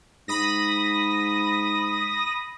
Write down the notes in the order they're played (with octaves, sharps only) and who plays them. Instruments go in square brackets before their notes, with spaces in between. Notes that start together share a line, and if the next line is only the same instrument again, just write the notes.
[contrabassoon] G#2 [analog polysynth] B5 D#6 A#6